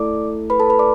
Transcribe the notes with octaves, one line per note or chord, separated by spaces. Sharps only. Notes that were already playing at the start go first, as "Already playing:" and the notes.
Already playing: A3 E4 A4 D5 D6
B4 B5
A4 A5
B4 B5
D5 D6